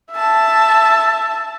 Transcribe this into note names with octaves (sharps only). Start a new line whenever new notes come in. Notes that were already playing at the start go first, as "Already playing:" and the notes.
E5 A5